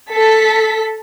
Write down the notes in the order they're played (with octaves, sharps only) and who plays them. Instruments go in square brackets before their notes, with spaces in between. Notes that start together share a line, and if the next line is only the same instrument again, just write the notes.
[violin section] A4 B6